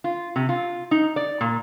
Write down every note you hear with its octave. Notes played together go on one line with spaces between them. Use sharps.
F4
C3
F4
D#4
D5
A#2